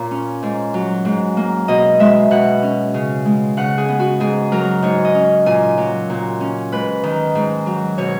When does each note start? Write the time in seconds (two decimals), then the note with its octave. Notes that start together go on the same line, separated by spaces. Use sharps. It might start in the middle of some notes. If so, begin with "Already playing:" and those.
Already playing: A#2 C#5
0.11 C#4
0.43 G#2
0.74 F#3
1.05 G#2
1.37 A#3
1.68 B2 D#5
1.99 G#3 E5
2.31 B2 F#5
2.63 C#4
2.94 C#3
3.26 G#3
3.57 C#3 F#5
3.78 G#4
3.89 B3
3.99 F#4
4.20 G#2 G#4
4.52 F#3 A#4
4.82 G#2 C#5
5.05 D#5
5.15 C#4
5.46 A#2 G#5
5.78 F#3
6.10 A#2
6.41 C#4
6.72 G#2 B4
7.03 D#3
7.35 G#2
7.66 F#3
7.98 B2 C#5